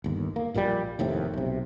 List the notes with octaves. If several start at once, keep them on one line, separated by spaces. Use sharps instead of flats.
G1 D#2
A#3
A#1 A#2 F3 G3
F1 D#2 A2 C3
B1 C3